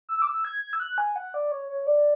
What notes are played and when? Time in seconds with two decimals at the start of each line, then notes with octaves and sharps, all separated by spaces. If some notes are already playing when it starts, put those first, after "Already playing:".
0.09 E6
0.22 D6
0.27 E6
0.45 G#6
0.62 G#6
0.73 E6
0.80 F#6
0.98 G#5
1.16 F#5
1.34 D5
1.52 C#5
1.70 C#5
1.87 D5